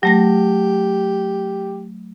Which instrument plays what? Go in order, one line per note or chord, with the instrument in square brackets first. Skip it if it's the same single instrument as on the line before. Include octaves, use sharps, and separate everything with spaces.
[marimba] F#3 A3 A#6 [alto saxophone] G4